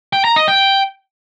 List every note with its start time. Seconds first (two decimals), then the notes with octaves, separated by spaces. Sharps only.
0.13 G5
0.25 A#5
0.36 D#5
0.48 G5